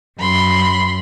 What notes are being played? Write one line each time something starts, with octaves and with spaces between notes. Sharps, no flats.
F#2 B5 C6